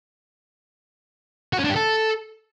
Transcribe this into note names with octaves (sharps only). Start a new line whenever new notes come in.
F#4
C#4
D4
G4
A4